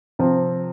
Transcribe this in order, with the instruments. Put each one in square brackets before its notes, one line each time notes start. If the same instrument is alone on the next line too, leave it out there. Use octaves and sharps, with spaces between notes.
[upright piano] C3 F3 C4